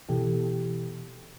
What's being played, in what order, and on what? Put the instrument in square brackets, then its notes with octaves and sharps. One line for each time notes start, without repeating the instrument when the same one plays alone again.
[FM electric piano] B2 E3 G4 A4